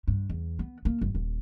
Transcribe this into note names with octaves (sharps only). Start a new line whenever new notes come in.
G2
E2
B3
A#3
G1
D#1